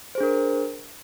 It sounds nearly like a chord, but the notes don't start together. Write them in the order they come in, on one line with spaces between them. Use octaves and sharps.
C5 G#4 D4 A#4